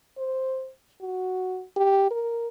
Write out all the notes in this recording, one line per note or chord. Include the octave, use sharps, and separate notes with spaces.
C5
F#4
G4
A#4